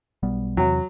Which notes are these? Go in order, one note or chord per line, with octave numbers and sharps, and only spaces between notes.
B1 G3 B3
E2 C3 F#3